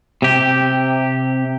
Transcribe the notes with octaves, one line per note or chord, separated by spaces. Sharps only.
C3 G4